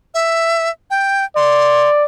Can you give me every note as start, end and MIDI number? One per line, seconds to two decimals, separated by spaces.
0.14 0.70 76
0.90 1.24 79
1.36 2.05 74
1.36 1.89 84